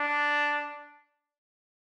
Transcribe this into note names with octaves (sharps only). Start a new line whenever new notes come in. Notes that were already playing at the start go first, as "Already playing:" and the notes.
Already playing: D4